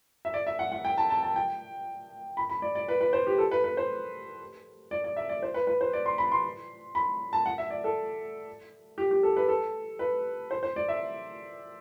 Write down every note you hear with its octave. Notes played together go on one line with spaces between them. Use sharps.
E5
D5
E5
F#5
F#5
G5
A5
A5
A5
G5
B5
B5
D5
D5
B4
B4
C5
G4
A4
B4
B4
C5
D5
D5
E5
D5
C5
B4
B4
C5
D5
C6
B5
C6
B5
A5
F#5
E5
D5
A4
G4
G4
A4
B4
A4
B4
C5
C5
D5
E5